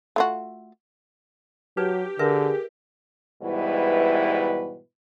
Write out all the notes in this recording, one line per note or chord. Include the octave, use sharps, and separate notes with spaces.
A3 F4 F#4
F#3 D#4 G4 B4
D3 G#4 A#4 B4 E5
G#2 B2 E3 G3 E4 B4